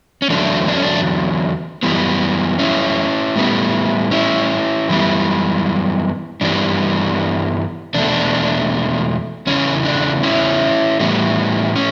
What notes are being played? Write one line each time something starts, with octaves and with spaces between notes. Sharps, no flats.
C#4
E2 D3 F#3 A3 D4
D4
C#4
D4
F#2 E3 G3 B3
C#4 E4
A2 G3 B3
C#4 E4
F#2 E3 G3 B3
G2 E3 G3 B3 D4
E2 B2 A3 D4
E2 C#3 E3 C#4
D4
C#4 E4
A2 E3 G3 B3
C#4